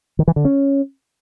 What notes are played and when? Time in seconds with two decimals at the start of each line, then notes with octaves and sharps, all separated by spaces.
0.19 D#3
0.28 E3
0.36 D3
0.45 C#4